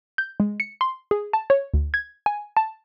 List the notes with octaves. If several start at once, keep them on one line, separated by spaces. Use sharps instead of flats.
G6
G#3
C#7
C6
G#4
A5
C#5
D2
G#6
G#5
A5